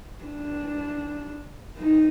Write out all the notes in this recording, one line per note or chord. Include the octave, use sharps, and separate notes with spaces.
D4
D#4